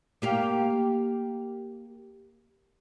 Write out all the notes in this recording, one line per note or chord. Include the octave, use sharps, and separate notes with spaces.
A#3 G4 F5